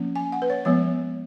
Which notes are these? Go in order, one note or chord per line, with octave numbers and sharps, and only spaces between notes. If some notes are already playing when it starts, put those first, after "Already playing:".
Already playing: F3 A#3 C#4
G#5
F#5
B4
C#5
F3 G#3 B3 C#5